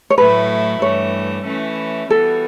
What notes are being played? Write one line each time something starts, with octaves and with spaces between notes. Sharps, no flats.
C#5
A2 F#3 A3 E4 B4
G2 E3 A3 C#5
E3 A3 C#4 E4
E3 G3 B3 F#4 A4